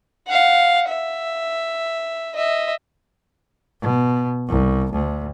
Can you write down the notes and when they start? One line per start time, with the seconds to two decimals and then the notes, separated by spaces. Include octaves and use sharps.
0.28 F5 F#5
0.89 E5
2.35 D#5 E5
3.81 B2
4.48 C2
4.92 D2